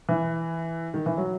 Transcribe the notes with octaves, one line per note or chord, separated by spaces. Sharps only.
E3
D#3
E3
F#3